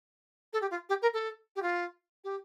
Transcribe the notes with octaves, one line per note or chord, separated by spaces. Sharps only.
A4
G4
F4
G4
A#4
A4
G4
F4
G4